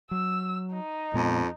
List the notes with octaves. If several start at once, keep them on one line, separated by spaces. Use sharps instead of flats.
F#3 E6
D#4
F2 A#2 G#3 B3